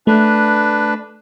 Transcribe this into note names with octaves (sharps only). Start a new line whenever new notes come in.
A3 D4 B4